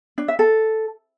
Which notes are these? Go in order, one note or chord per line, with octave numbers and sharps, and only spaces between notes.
D4
E5
A4